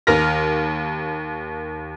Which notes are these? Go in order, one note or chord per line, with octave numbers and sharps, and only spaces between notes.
D#2 A#4 F6 A#6